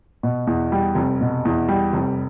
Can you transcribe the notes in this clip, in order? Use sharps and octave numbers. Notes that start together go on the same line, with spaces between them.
B2
E2
G3
F1
B2
E2
G3
F1